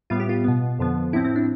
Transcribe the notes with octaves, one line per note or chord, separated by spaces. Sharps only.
A2 G3 B3 F4
G4
F4
B2 B3
F2 D3 F3 B3
A2 F3 C4 E4
C4
D4